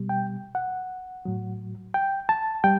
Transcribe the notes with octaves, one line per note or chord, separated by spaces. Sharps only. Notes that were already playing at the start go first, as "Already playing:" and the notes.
Already playing: B2 G3
G5
F#5
A2 F#3
G5
A5
G3 G5